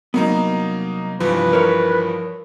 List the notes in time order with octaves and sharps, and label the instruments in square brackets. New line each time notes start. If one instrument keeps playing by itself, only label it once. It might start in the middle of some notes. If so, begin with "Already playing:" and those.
[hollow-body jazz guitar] C2 B3 [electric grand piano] F#3 A#3 D#4
[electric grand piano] G2 E3 F3 [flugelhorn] B4
[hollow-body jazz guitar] A#4 C5 C#5